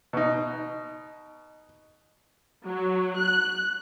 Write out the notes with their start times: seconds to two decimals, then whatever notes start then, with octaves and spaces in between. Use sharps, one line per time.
0.13 B2 D#4
2.64 F#3
3.17 F#6